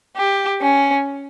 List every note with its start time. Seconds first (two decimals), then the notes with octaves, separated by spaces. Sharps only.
0.16 G4
0.62 C#4